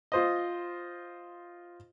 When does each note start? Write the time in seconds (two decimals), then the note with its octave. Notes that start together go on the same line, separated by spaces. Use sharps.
0.12 F4 C5 D#5